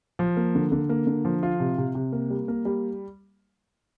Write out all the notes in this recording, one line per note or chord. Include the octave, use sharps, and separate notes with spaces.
F3
A#3
D3
D3
A#3
D3
F3
F4
C3
C3
C3
A#3
G3
A#3
G3